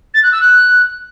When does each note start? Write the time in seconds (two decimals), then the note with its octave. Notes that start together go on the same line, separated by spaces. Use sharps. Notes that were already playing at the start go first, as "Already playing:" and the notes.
0.14 A6
0.23 F#6
0.32 E6
0.41 F#6